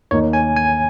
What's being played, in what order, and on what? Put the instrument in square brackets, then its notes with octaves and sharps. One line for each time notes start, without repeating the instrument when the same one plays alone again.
[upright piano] D#2 D#3 A#3 D#4 [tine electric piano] C#5
[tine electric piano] G#5
G#5